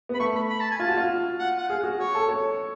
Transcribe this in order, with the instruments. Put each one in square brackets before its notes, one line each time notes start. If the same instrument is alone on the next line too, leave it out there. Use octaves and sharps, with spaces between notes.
[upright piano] B3 [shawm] B5
[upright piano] A3 [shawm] C#6
[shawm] B5
B5
A5
G#5
[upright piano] F4 [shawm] A5
[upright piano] F#4
F4
[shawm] F#5
F#5
[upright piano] G#4 [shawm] F5
[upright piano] F#4
[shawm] C#5
[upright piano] A4
C#5